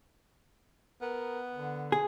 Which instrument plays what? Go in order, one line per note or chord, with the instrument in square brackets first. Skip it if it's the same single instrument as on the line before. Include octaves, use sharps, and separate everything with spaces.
[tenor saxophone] B3 [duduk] A#4
[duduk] D3
[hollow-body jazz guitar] G#4